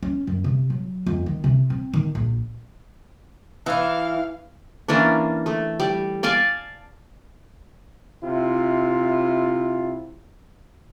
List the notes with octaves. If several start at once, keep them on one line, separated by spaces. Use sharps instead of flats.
C#4
F#2
C3
F#3
F2
D#3
C3
C4
D#3
A#1
E3 E4 F5
E3 A#3 C#4 D4
A3
G3
D5 F5 G#5 A5
C3 E4 F4